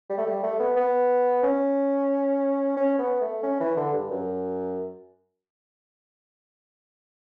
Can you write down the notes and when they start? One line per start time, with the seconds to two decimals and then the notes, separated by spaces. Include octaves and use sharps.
0.10 G3
0.18 A3
0.26 G3
0.43 A3
0.60 B3
0.76 B3
1.43 C#4
2.77 C#4
2.99 B3
3.21 A3
3.43 C#4
3.60 E3
3.77 D3
3.93 G2
4.11 F#2